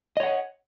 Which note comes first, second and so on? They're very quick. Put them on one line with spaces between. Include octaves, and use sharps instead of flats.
D#5 C#5 F#5